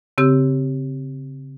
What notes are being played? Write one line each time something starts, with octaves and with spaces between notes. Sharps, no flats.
C#3 C4 G4 E6